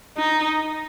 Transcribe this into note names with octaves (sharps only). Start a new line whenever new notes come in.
D#4